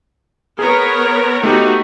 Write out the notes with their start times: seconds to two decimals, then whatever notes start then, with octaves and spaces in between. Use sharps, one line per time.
0.59 B3 G#4 A#4 C#5
1.43 A3 B3 D#4 F#4 G4